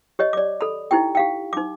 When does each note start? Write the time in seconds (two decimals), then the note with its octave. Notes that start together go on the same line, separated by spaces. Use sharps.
0.19 G4 C#5 D#5
0.33 D5 D6
0.61 A4 B5
0.91 D#4 E4 G4 G5
1.15 G4 F5 G5
1.53 D#4 D6